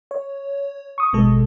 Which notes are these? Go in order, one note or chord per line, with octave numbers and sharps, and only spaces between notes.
C#5
C#6 D#6
G#1 B2 G#3 A4